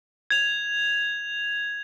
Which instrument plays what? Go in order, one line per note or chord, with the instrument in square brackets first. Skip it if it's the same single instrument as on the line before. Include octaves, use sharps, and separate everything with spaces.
[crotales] G#6 F7